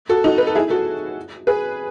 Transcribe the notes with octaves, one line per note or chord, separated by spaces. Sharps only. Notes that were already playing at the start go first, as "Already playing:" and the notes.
F#4 A4
D#4 F#4
B4
A4
E4 G#4
F#4 A4
G#4 B4